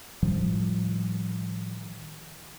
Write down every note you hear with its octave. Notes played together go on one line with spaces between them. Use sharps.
A2 D#3 F3 G3